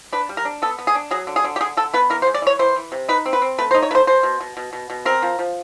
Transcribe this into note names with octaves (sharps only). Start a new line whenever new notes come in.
D4 B4
G3
A#4
D4
B3 A4
B3
G#4
D4
F#3 G#4
D3
G#4
D3
G4
D3 G#4
D3 A4
B3 B4
E3 A#4
C5
G#3
D5
E3 C#5
E3 C5
E3
C3
D#4 B4
C4
B4
C4
A3 B4
C5
D#4
C#5
A3 B4 C5
B2 C5
B2
B2
B2
B2
B2
C4 A#4
F3
F3